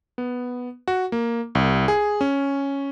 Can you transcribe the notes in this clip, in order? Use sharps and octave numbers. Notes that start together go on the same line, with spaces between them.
B3
F#4
A#3
C2
G#4
C#4